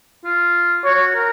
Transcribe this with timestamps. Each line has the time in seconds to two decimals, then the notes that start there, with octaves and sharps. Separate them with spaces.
0.25 F4
0.85 F#4 C#5
1.14 A#4